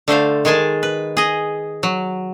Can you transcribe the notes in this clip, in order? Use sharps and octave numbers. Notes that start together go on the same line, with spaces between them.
D3 A3 C5 F5
D#3 G#3 G#4 G#5 A5
B4
G#4 D#5
F#3